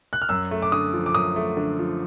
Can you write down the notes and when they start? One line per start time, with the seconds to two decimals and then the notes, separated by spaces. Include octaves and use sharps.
0.13 F#6
0.22 F6
0.29 F#2 E6
0.51 A3
0.62 D6
0.72 D3 D#6
0.93 F3
1.06 D6
1.14 F#2 D#6
1.36 A3
1.57 D3
1.79 F3